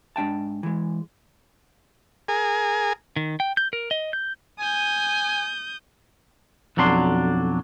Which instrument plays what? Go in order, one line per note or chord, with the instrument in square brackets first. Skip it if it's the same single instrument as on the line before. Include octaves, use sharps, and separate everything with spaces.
[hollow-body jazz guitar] G#2 D4 G5 A5
E3 G#3
[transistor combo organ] G#4 A#4 G#5
[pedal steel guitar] D#3
G5
G6
A#4
D#5
G6
[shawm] G#5 [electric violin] D#6 G6
[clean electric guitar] B1 F2 F#3 D4 C6